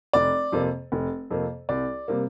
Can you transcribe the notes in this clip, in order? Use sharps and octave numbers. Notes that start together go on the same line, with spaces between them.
F1 D5
F2 C3 A#3
F1
F2 C3 A#3
C2 D5
C3 G3 A#3